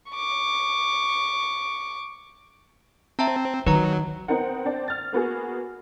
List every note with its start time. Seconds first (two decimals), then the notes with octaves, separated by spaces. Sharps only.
0.11 C#6 D6
3.19 C4 E5 A5 A#5
3.66 D#3 F#3 B4 A#5
4.28 B3 C4 D#4 A#4 F#5
4.65 C4 D4
4.88 F6 A6
5.13 A#3 B3 F#4 G#4